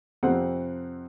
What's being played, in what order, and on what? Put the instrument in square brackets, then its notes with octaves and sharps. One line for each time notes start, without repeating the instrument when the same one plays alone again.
[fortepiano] F2 C3 C4 F#5